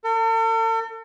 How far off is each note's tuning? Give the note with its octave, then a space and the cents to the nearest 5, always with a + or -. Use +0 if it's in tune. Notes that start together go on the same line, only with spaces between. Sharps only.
A4 +45